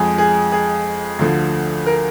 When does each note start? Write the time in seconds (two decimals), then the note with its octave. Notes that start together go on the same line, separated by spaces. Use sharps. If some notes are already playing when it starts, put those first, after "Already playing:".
Already playing: F2 F3 G#3 G#4
0.18 G#4
0.52 G#4
1.19 D2 D3 F3
1.86 A#4